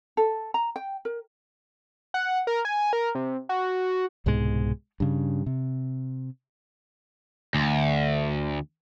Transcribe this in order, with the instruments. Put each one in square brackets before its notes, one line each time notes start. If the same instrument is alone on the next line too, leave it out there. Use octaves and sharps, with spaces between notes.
[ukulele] A4
A#5
G5
A#4
[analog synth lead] F#5
A#4
G#5
A#4
C3
F#4
[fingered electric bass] C2 G#2 B2 G#3
G2 C#3
C3
[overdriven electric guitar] D2